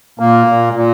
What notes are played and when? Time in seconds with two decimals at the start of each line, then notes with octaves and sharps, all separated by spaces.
0.19 A#2 A#3
0.47 A#2
0.74 A#2